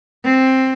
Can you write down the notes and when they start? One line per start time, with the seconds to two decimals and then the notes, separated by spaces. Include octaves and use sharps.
0.24 C4